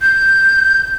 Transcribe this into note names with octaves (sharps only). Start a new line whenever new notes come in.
G6